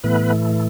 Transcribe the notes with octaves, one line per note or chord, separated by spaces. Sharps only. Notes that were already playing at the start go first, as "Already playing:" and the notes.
A2 E3 A3 B3 B4